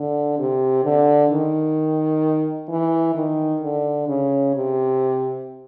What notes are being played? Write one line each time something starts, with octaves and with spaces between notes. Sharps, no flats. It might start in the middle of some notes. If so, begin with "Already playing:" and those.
Already playing: D3
C3
D3
D#3
E3
D#3
D3
C#3
C3